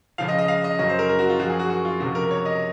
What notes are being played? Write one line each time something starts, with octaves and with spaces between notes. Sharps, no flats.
C#2 C#3 F3 F5
D#5
D#5
F5
D#5
F#2 C#3 F#3 D#5
C5
A#4
A#4
F#4
F4
F#2 F3 F#4
G#4
F#4
F#4
F4
C#2 C3 F3 F#4
A#4
C#5
D#5